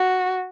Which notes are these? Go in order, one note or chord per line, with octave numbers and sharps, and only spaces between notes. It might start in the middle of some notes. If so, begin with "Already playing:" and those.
Already playing: F#4